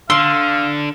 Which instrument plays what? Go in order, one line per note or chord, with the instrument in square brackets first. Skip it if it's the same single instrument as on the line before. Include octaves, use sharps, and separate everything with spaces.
[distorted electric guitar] D3 [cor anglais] F5 [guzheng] C6 [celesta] E6